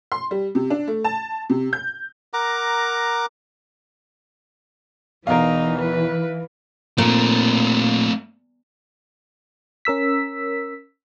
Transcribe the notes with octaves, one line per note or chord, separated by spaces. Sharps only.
C6
G3
C3
D4
A3
A5
C3
G6
A#4 F#5 A#5 D6
E2 B2 E3 D#4 A#4 F5
B4
A#2 A3 C4
C#4 A#4 E6 B6